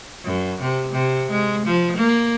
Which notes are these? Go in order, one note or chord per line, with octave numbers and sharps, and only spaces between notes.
F#2
C3
C3
G#3
F3
A#3